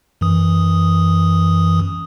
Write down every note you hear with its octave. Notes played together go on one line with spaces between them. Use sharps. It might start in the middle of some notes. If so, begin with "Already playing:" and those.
F#2 E3 D#6